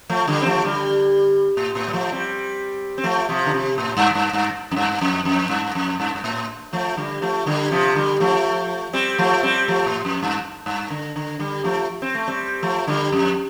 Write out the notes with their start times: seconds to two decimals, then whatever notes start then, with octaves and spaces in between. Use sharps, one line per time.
0.10 F3 A3
0.28 D3 G3
0.41 C4
0.46 F3 A3
0.64 D3 G3
1.57 A2
1.75 A2
1.87 G3
1.93 F3 A3
2.12 G3 C4
2.98 C4
3.04 F3 A3
3.29 C3 F3
3.46 D3
3.54 C3
3.78 A2
3.97 G2
4.15 G2
4.33 G2
4.71 F2
4.76 G2
5.01 F2
5.25 F2
5.49 G2
5.75 F2
6.00 G2
6.15 G2
6.24 A2
6.73 F3 A3
6.97 D3 G3
7.22 F3 A3
7.46 D3 G3
7.71 C3 F3
7.95 D3 G3
8.20 F3 A3
8.93 G3 C4
9.18 F3 A3
9.43 G3 C4
9.68 F3 A3
9.86 A2
10.05 F2
10.23 G2
10.66 G2
10.90 D3
11.16 D3
11.39 D3 G3
11.64 F3 A3
12.02 C4
12.15 A3
12.28 G3 C4
12.62 F3 A3
12.87 D3 G3
13.12 F2